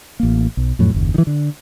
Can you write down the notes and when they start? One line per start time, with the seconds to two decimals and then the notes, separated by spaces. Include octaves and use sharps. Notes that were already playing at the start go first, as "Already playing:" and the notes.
0.20 A1 A#3
0.57 B1
0.79 F2 A2 F#3
0.94 F#1 D#2
1.14 D#3 E3
1.27 D3